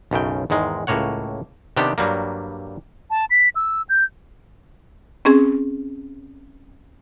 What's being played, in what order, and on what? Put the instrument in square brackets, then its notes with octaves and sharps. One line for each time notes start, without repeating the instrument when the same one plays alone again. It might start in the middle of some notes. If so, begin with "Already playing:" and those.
[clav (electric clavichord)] B1 F#2 C#3 G5
E2 G#2 D#3 G#3
C#2 A2 A#3 C#5 F#5
C3 D#3 B3 D4 G4
G2 F#3 G3 A#3
[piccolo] A5
B6
E6
G6
[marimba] C4 C#4 G#4